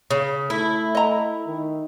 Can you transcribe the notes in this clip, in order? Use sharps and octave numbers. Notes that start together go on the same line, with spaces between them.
C#3
A3 E4
D#5 A#5
D#3